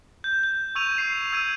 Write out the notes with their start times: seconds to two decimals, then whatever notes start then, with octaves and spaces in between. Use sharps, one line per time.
0.24 G6
0.43 G6
0.75 C#6 E6 G#6 D#7 F7
0.98 C7
1.33 E6 G#6 D#7